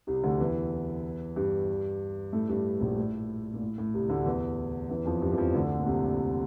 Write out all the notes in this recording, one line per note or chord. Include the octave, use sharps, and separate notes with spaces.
C2 C3
D2 D3
E2 E3
G2 G3
A2 A3
G2 G3
A#1 A#2
A2
A#2
A2
A2
C2 C3
D2 D3
E2 E3
E2 E3
F2 F3
G2 G3
E3
F2 F3
D2 D3
A#2
C2 C3